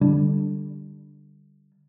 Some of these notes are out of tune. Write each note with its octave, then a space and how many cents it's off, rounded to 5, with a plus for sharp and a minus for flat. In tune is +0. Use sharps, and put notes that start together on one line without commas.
D3 +0 G3 +0 D4 -5